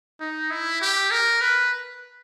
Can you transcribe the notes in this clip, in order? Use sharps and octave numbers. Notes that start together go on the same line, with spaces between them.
D#4
E4
G4
A#4
B4